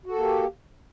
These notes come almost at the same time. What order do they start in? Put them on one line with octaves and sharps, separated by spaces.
F#4 A4 A#3 G4